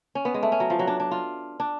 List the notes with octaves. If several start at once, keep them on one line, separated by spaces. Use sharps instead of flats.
C#4
B3
G#3
A3
C#4
F#3
F3
F#3
D4
D4
F4
D4